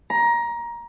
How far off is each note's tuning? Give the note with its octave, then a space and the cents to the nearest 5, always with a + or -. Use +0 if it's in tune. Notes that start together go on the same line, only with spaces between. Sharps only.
A#5 +20